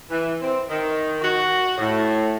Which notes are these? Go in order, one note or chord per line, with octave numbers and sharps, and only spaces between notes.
E3
C4
D#3
F#4
A2